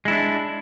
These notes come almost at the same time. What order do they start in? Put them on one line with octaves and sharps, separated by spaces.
G#3 E4 D4